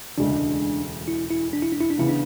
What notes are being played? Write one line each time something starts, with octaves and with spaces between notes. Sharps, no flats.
E1 D2 C#3 G#3 D4
E4
E4
D4
E4
D4
E4
D4
C#3 E3 B3 E4
D4